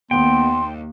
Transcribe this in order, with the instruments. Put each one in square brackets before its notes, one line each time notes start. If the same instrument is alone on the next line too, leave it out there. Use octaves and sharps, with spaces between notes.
[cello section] D#2 [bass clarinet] B3 [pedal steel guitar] G5 [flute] C6